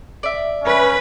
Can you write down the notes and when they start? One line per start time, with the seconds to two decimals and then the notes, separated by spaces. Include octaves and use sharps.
0.23 D5 E5
0.64 C#4 B4